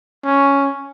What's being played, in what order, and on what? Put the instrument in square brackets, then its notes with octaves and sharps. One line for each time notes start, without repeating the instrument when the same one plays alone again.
[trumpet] C#4